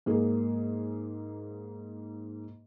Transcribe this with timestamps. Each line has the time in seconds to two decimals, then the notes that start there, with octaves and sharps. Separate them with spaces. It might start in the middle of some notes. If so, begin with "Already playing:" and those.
0.06 G#2 A#3 G#4